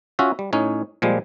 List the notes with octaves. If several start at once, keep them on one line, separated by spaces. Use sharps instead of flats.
C#4 F4 F#4 E5
G3
A2 C#4 D#4
A#2 F3 G3 G#3